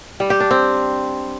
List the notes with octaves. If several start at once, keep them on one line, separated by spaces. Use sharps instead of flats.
G3
G4
D4
C4